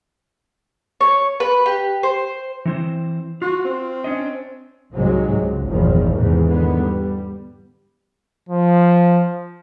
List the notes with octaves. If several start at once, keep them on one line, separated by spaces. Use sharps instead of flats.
C#5
B4
G4
C5
E3 C4 C5
F4 F#4
C4
C#4 D4 D#5
C2 G#2 C3 F#3 G#3
C#2
G1 E2 A#2 D#3 F3
E2 G#2 C3 D#3 E3
D3 D#3 B3
G3
F3